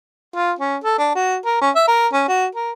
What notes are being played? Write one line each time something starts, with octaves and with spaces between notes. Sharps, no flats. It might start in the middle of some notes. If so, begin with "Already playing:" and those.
F4
C#4
A4
D4
F#4
A#4
C#4
E5
A#4
C#4
F#4
A#4